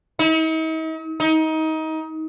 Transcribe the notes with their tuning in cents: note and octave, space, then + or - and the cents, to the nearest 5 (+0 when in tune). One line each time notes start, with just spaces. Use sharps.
D#4 +45
D#4 +25